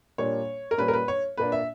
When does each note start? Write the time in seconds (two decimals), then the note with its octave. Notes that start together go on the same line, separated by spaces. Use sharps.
0.18 A#2 G3 A#3 D4 C#5
0.71 A#4
0.78 A#2 G3 C#4 B4
0.88 A#4
0.93 B4
1.08 C#5
1.37 A#2 A#3 D4 B4
1.52 E5